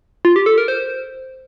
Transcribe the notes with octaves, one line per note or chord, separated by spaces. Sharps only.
F4
G4
A4
A#4
C5